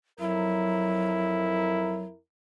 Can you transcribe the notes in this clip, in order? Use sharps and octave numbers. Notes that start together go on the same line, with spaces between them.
F2 F#3 E4 A#4